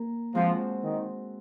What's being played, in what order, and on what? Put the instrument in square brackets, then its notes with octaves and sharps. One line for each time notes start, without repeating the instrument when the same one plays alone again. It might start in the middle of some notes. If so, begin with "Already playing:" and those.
Already playing: [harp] A#3 A#4
[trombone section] F3 [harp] G#3 C4 F#4 C5
[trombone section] D#3